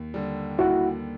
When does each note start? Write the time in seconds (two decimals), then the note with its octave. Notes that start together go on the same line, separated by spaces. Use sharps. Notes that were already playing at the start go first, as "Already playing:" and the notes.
Already playing: D#2
0.14 D3 G3
0.58 D#2 E4 F#4